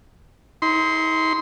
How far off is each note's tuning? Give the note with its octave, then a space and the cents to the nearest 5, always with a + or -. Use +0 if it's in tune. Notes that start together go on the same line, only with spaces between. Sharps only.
D#4 +40 C6 -10